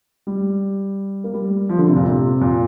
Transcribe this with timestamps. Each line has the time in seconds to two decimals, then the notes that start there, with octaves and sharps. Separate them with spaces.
0.27 G3
1.24 A#3
1.34 G3
1.69 F3
1.78 D3
1.87 C3
1.96 A#2
2.05 C3
2.41 A#2